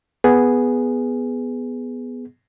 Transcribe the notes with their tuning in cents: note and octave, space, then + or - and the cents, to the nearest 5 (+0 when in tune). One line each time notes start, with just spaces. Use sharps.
B3 +0 G#4 +0